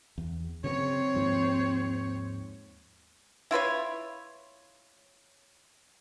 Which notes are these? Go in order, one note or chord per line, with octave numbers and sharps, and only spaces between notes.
E2
C#3 F#3 B3 C4 C#5
D#2 G#2 F3
E4 F4 B4 C#5